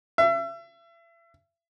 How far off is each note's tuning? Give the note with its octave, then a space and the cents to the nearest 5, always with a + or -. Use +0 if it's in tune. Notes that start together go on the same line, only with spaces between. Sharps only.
E5 +35